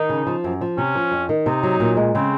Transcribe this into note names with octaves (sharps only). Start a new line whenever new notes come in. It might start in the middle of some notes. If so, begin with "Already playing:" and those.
Already playing: D#3 D#4
C#3
F3
F#2
F3
C3 C#4
F3
F2
D#3
C3 D#4
F#3
A#2
G#3
C#3 C4